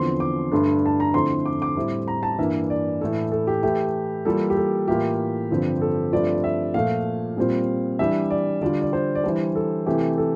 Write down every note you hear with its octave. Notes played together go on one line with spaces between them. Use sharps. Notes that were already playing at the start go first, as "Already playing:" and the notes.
Already playing: E2 D3 F3 C4 C6
D6
G2 D3 A3 D4 C6
A5
A#5
F2 D3 A3 C4 E4 C6
D6
D6
A2 G3 C4 E4
A#5
A5
G2 E3 A#3 D4 E5
D5
A2 E3 A3 E4 A4
A4
G4
E3 A3 E4 G4
E3 G3 A#3 F4 A4
G4
A4
A2 E3 A#3 F4 G4
G2 D3 F3 C4
A4
G2 F3 A3 C4 F4 D5
E5
A#2 F3 A3 F5
A#2 G3 C4 F4
E3 G3 D4 E5
D5
D3 G3 D4 F4 D5
D5
C5
D5
E3 G3 D4 C5
A4
C3 E3 A3 G4
A4